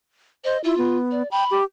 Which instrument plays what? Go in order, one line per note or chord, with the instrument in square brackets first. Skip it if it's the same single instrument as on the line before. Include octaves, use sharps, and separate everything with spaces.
[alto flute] C5 [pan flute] D#5
[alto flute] E4 [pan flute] F4
[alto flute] B3
[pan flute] D5
[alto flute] G5 [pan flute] B5
[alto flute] G4